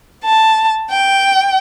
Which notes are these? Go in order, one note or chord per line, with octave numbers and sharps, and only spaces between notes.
A5
G5